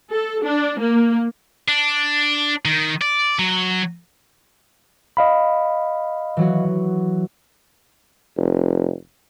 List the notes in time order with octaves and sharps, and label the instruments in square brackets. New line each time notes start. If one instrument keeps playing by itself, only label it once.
[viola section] A4
D4
A#3
[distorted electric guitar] D4
D#3
D5
F#3
[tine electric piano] D#5 F5 B5
[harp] E3 F#3 F#4
[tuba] F1